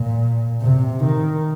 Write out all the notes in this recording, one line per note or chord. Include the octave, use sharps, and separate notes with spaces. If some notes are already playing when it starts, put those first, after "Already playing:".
Already playing: A#2
C3
D#3